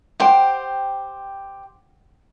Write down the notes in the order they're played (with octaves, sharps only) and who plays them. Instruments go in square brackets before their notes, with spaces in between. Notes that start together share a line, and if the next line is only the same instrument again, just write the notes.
[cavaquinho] G4 C5 [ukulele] F#5 G5